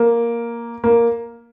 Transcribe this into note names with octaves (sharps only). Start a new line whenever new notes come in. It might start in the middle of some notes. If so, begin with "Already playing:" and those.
Already playing: A#3
A#3